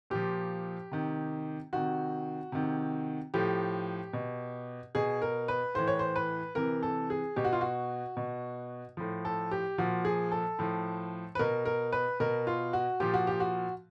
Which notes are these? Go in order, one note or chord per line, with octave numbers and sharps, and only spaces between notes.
A#2 F3 G4
C3 D#3
C3 D#3 F#4
C3 D#3
A2 F3 G4
B2
B2 G#4
A#4
B4
A2 E3 C5
C#5
C5
B4
C3 E3 A#4
A4
G#4
B2 G4
F#4
F4
F#4
B2
A2 F3
A4
G4
A#2 F3 F#4
G#4
A4
A2 F3
B4
B2 A#4
A#4
B4
B2 A#4
F4
F#4
A#2 F3 G4
F#4
G4
F#4